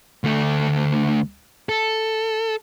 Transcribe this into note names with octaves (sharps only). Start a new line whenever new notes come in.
D2 A3
A4